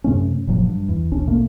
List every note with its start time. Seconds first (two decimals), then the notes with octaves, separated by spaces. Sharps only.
0.04 F#2 C3 A3 C#4
0.47 F#1 A#2 F3 F#3
0.65 G2
0.88 E2
1.12 A#1 D#2 C#4 D4
1.27 B2 A3 A#3